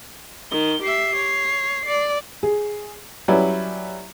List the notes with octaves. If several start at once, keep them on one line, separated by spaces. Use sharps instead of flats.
D#3 G7
G4 E5 C7
C#5
D5
G#4
F#3 G3 C#4 E4 B4 D5